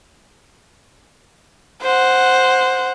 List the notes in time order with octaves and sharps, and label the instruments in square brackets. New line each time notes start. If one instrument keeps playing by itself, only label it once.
[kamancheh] C5 F#5